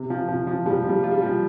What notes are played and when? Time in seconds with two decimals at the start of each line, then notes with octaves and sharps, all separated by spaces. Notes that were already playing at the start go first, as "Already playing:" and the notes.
Already playing: C3
0.10 F3
0.28 F3
0.47 F3
0.66 F3 G3
0.84 F3 G3
1.03 F4
1.11 G3
1.22 F3